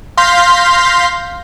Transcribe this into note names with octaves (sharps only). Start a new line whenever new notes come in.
F5 C6 G6 A#6 B6